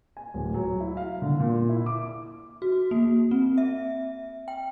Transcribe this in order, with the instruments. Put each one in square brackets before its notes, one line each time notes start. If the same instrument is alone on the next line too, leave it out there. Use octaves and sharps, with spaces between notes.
[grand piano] G#5
D1
F#3
E4
F5
D3
A#2
E4
D6
[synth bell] F#4
A#3
C4
E5
G5